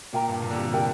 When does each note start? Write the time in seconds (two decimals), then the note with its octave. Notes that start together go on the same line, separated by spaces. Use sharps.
0.13 A#2 A#4 G5 A#5
0.28 G2
0.42 A#2
0.51 D3
0.57 C3
0.72 C3 A#4 G5 A#5